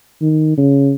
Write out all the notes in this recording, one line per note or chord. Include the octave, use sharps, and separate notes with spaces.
D#3
C#3